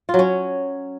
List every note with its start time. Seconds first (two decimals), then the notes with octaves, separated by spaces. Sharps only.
0.09 F4
0.14 F#3
0.19 C#4